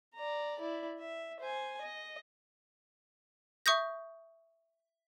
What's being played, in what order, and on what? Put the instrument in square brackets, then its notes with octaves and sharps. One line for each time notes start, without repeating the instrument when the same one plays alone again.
[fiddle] D5 A#5
E4 D5
E5
C5 G#5
D#5
[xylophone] E5 C#6 D#6 G6 A#6